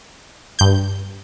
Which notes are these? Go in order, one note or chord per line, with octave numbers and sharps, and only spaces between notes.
G2 G6